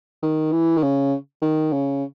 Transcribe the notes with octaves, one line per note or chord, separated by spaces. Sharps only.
D#3
E3
D#3
C#3
D#3
C#3